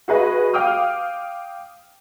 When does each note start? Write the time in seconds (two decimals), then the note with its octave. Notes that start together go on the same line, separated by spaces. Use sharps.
0.08 F#4 G#4 B4 D#5
0.53 F5 G5 D6 D#6 F6